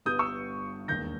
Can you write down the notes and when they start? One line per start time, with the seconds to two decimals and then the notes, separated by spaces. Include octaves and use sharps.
0.06 G1 G2 G3 B3 D#6 G6
0.19 C#6 E6
0.88 E1 D#2 D#3 G6 A#6